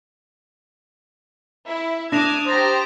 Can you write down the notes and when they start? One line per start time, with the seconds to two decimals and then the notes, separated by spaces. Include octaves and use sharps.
1.66 E4 E5
2.12 D4 D6 D#6 G#6 A#6 E7 F7
2.47 G4 C5 A#5 D#6 A6 A#6